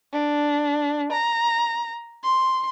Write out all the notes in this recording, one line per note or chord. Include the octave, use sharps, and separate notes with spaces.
D4
A#5
C6